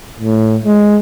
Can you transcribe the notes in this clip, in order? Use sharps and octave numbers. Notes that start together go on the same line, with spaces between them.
A2
G#3